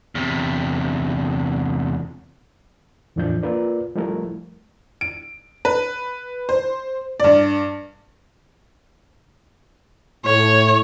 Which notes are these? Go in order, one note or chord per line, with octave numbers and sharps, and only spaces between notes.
E2 C3
E2 A2 E3 F3 D4 G6
A#3 F4 A#4 B4 D5
F3 G3 A3 E4 A#4
D7
B4
C5
G2 D5
A2 C#5